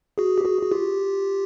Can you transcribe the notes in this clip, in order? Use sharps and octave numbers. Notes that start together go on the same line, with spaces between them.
F#4 G#4
G4
F#4 G#4
F#4
F4 G4